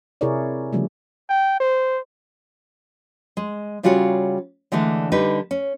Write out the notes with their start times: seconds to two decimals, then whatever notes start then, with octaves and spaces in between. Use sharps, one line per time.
0.21 C3 E4 G#4 A#4 C#5 D5
0.73 C#3 F3 G3 A3
1.29 G5
1.60 C5
3.37 G#3
3.83 C#3 G3 F4 F#4 G#4 C#5
4.72 D3 E3 G#3 A3 D4
5.12 D3 G3 D#4 B4
5.51 C#4